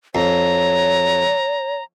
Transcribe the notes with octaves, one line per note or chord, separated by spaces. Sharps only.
F2 C#5 A#5